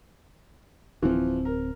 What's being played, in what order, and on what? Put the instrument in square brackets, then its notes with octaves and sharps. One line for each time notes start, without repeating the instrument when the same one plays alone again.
[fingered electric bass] D1 C4 [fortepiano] E3 F3
[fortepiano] A#4